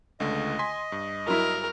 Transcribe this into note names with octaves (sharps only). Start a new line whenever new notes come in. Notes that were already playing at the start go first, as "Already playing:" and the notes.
C#2 D3 A3 D#5
G#5 C6 B6
G2
F#3 E4 A#4